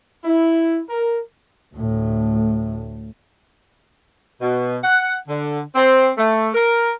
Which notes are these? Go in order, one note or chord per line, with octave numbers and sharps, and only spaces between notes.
E4
A#4
D2 A2
B2
F#5
D3
C4
A3
A#4